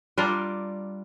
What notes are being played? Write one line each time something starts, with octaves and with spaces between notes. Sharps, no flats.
G3 D4 F4 A#4